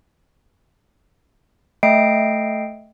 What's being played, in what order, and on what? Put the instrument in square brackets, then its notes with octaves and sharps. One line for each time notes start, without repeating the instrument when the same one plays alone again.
[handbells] A3 D#5 E5 G5 C7 D7